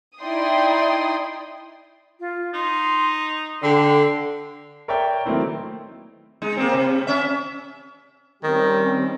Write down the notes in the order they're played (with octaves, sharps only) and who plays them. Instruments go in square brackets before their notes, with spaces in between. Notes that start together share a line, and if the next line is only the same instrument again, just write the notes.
[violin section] D#4 E4 D5 G5 C6 D#6
[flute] F4
[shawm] D#4 [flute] C6
[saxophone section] D3 [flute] G5 [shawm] C6
[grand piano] A#4 C#5 D5 E5 G5
D#3 F#3 A3 A#3 C4 E4
[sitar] G#3 D#4
A#3 C4
C3
C#4 E5
[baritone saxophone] D#3 [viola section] G3 C4 C#4